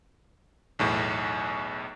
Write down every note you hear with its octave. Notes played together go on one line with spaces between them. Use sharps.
B1 E2 A2